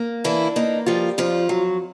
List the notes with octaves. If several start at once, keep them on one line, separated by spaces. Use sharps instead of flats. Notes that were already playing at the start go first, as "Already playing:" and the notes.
Already playing: A#3
E3 D4 E4
A#3 D#4
F3 G3 F4
F2 F3 F4
F#3